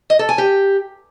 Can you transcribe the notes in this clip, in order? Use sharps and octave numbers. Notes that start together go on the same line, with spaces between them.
D#5
A4
G#5
G4